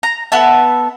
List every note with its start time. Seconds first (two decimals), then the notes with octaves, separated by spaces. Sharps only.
0.03 A#5
0.32 B3 A4 E5 A5